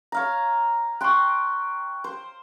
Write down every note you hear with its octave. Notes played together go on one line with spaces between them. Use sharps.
C#5 F5 A#5
G5 C6 C#6 F#6
C5